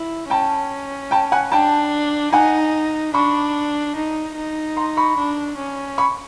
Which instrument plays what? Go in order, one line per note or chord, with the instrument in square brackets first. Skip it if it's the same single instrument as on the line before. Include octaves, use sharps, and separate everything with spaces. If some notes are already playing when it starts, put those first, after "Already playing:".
Already playing: [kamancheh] E4
[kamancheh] C#4 [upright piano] G5 A5
[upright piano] G5 A5
F#5 G#5
[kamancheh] D4 [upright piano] G5 A5
[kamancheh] D#4 [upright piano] F#5 G#5
[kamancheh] D4 [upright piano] B5 C#6
[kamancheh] D#4
D#4
[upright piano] A#5 C6
B5 C#6
[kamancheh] D4
C#4
[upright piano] B5 C#6